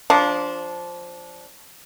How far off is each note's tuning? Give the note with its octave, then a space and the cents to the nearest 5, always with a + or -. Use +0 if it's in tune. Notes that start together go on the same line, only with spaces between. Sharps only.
F3 +0 D4 -20